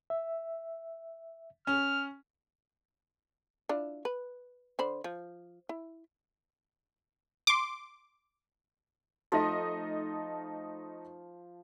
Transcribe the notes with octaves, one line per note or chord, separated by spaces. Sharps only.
E5
C#4 F6
D4 E4 F4
B4
D3 C5 B5
F3
E4
C6 D6
F3 A3 D#4 D#5